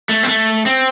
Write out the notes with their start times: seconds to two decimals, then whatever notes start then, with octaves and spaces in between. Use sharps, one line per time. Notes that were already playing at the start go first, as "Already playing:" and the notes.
0.09 A3
0.23 C4
0.28 A3
0.66 C4